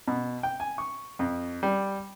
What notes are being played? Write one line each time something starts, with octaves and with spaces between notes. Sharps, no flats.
B2
G5
G#5
C#6
F2
G3